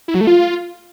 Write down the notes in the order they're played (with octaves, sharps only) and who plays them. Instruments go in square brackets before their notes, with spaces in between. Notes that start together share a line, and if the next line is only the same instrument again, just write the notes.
[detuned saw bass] E4
F#3
A3
F4